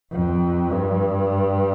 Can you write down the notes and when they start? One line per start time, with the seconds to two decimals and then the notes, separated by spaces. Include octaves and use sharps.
0.13 F2
0.71 G2